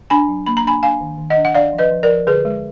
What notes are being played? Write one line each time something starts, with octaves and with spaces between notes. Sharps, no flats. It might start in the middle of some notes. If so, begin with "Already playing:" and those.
D4 G#5 B5
F#3
A#3 B5
A#5
D4 G#5 B5
D4 F5 G#5
D#3
D#3
D#5 F#5
D4
F#5
D4 D5 F5
F3
B4 D#5
F3
A#4 D5
F3
D3 G#4 B4
G#3